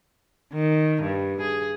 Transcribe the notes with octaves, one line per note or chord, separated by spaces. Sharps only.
D#3
G2
G#4